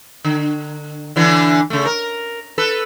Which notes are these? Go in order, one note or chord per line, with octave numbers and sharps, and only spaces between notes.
D3
D3 E3 D4
C#3 A3
A#4
A4 B4